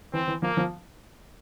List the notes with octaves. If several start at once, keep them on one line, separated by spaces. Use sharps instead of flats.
E3 C4
E3
F3 A#3
F3